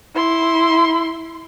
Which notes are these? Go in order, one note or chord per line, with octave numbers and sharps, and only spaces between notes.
E4 C6